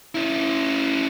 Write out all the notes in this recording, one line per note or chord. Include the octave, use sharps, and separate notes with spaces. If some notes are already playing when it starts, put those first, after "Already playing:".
C#4 E4